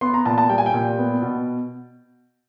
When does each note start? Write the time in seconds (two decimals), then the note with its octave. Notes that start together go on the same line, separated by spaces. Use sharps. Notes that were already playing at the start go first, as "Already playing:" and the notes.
0.01 B3 C6
0.14 A#5
0.25 A#2 A5
0.38 A5
0.49 G3 G5
0.58 G#5
0.66 G5
0.74 A#2
0.98 B3
1.22 B2